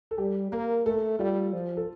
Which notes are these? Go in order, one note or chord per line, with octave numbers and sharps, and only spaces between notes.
A4
G3 G4
A#3 A#4
A3 A4
G3 F4
F3
A4